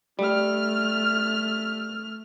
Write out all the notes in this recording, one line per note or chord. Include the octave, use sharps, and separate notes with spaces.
G3 A3 F6